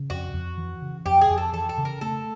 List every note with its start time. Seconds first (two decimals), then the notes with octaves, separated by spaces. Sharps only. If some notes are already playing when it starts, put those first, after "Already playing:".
Already playing: C#3
0.10 F2 F#4
0.34 F2
0.58 E3
0.82 C#3
1.06 F2 G4
1.21 G#4
1.30 F2
1.38 A4
1.53 E3 A4
1.69 A4
1.78 C#3
1.85 A#4
2.01 A3 A4